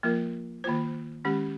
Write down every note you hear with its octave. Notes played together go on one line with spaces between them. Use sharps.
F3 A#3 F4 A#4
D#3 A#3 F4 C5
D#3 G#3 C#4 G4